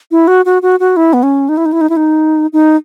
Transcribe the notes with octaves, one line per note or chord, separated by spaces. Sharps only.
E4
F#4
F#4
F#4
F#4
E4
B3
C#4
D#4
E4
D#4
E4
D#4
E4
D#4
D#4